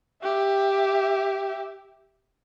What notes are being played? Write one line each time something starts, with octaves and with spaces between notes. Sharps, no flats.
G4 E5